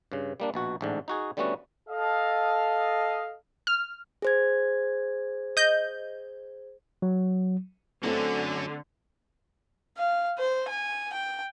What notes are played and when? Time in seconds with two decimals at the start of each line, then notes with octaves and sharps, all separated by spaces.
0.12 G2 C#3
0.40 G3 A#3 D4
0.54 A#1 B2 F#4
0.81 A1 G#2 D3
1.08 D#4 F#4 G#4
1.37 D3 G3 A3 B3 C#4 F#4
1.89 A4 D#5 F5
3.67 F6
4.22 G#4 C5 G#6
5.57 D#5 G6
7.02 F#3
8.04 D3 F#3 A3 C4 C#4
9.98 F5
10.39 C5
10.69 G#5
11.13 G5